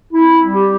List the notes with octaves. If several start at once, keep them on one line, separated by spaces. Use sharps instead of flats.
C4 E4
G3
G4